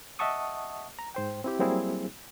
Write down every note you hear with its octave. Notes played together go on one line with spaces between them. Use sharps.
D#5 E5 F#5 A5 C#6 D#6
A#5
G#2 C5 G5
C4 E4 G4
F#3 G3 A#3 C4 E4 G#4